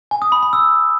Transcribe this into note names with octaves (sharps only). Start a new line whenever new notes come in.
G#5
D#6
B5
B5
E6